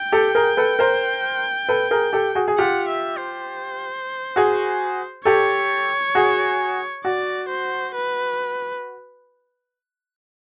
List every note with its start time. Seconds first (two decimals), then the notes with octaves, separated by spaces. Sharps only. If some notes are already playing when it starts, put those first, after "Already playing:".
Already playing: G5
0.12 G4 A4
0.35 G#4 A#4
0.57 A4 B4
0.79 A#4 C5
1.69 A4 B4
1.91 G#4 A#4
2.13 G4 A4
2.35 F#4 G#4
2.48 G#4
2.58 F4 G4 F#5
2.88 E5
3.18 C5
4.36 F#4 G#4
5.25 G4 A4 C#5
6.15 F#4 G#4
7.05 F#4 D5
7.49 C5
7.94 B4